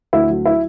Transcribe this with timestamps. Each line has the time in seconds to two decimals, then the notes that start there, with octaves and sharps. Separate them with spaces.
0.13 D2 E4
0.29 F#3
0.46 E4